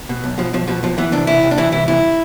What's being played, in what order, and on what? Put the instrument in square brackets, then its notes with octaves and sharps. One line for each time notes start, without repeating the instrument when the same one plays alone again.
[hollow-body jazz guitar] B2
B1
B2 F3
B1 F3
B2 F3
B1 F3
E3 B3
C2 D4
C2 E4
C2
D4
E3 E4
C2 E4
C2 E4